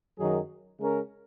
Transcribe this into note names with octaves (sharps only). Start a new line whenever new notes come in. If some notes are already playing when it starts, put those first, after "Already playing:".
F#2 D#3 F#3 D#4 G#4
C#3 G#3 C#4 A#4